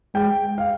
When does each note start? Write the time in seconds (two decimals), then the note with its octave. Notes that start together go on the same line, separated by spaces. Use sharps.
0.15 G#3 G5
0.58 F5